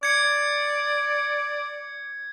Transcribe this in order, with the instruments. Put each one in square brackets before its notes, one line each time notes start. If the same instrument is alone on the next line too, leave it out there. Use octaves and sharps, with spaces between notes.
[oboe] D5 [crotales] G#6 C#7